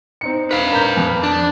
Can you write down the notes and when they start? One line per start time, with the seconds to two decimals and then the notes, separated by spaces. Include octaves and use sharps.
0.21 C4 D#4 C#7
0.51 B4 F5
0.72 A#4 G6
0.97 F2
1.23 D4